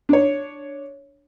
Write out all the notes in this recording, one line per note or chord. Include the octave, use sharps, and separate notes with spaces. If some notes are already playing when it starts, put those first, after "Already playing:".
D4 C#5